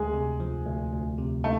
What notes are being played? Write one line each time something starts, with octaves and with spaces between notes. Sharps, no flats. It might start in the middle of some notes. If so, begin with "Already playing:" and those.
Already playing: D2 G#3 G#4
C3
F3
D2
D2
C3
A3